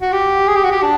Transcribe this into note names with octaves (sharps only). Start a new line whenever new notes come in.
F#4
G4
G#4
G4
F#4
G4
D4